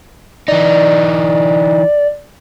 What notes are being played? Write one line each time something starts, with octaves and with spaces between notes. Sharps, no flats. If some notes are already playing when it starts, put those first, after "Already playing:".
E3 D#4 D5